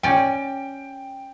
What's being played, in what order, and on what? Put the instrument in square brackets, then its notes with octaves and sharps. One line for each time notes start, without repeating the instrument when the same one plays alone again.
[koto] C#4 D5 [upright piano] G5